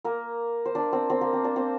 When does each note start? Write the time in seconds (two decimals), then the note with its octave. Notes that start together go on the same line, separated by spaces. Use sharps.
0.05 A#3 A#4
0.65 C5
0.75 D4 D5
0.92 C4 C5
1.10 C4 C5
1.21 A#3 A#4
1.33 C4 C5
1.44 D4 D5
1.56 C4 C5